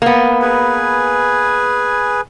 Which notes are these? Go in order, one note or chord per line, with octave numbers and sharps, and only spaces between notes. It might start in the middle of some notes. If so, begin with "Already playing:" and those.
A#3 B3
G#4 B4 G#5